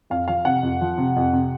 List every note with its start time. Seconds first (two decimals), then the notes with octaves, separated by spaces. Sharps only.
0.10 F2 F5
0.28 F3 F5
0.45 C3 F#5
0.63 F2
0.81 F3
0.98 C3
1.16 F2
1.33 C3